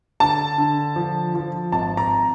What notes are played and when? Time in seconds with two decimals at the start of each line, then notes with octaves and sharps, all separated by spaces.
0.20 D3 A5
0.58 D3
0.96 F3
1.35 F3
1.72 G#1 A5
1.97 A#5